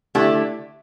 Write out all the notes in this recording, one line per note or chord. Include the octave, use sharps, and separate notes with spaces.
D3 A3 E4 G4